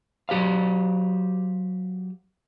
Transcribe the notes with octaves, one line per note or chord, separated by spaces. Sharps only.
F#3 G4 C5 F5